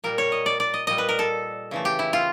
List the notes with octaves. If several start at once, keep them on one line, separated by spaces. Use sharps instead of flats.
A#2 G3 A#4
C#5
D#5
D5
D5
D#5
A#2 G3 D#5
B4
A#4
A4
C#3 E3 A3
G4
E4
F4